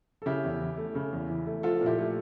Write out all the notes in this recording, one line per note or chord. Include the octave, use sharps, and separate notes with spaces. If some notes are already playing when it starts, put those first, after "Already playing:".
A4
C#3 E4 G4
E2
E3
A3
C#3
E2
E3
A3
F3 F4 A4
A#2
E4 G4
A3